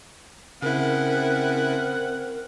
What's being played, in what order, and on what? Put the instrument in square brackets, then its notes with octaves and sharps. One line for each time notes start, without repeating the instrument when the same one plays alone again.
[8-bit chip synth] C#3 E4 [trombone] C4 [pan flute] A#4 [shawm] F#5